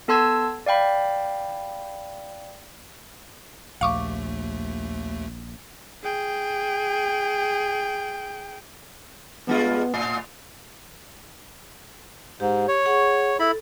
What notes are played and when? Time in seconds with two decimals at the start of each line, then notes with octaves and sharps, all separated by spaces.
0.08 B3 A4 A5 C6 E6 G#6
0.66 D5 F5 G5 B5
3.81 A#1 D#2 A3 F5 C#6 D6
6.04 G#4 G5
9.47 G2 G#3 B3 F4
9.94 A2 C7
12.40 G#2 G4
12.68 C#5
12.86 G#4 F#5 C#6
13.40 E4 A4 B5